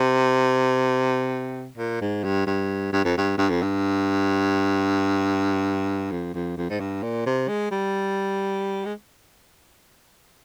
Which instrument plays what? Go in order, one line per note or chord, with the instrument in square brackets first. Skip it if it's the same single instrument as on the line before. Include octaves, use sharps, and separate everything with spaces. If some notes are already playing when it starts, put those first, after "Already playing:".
Already playing: [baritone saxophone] C3
A#2
G#2
G2
G2
G2
F2
G2
G2
F2
G2
F2
F2
F2
G#2
G2
A#2
C3
G#3
G3
G#3